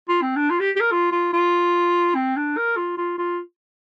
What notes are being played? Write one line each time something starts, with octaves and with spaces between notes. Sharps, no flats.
F4
C4
D4
F4
G4
G4
A#4
F4
F4
F4
C4
D4
A#4
F4
F4
F4